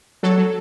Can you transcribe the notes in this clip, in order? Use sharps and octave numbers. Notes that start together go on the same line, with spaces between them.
F#3 A4
F#3